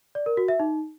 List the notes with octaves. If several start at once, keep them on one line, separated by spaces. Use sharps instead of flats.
D5
A#4
F#4
E5
D#4